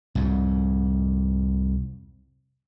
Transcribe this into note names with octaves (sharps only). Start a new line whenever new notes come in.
C2 F2 G#2